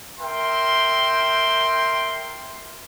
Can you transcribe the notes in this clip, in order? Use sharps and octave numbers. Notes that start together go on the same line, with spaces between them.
A#4 E5 G5 C6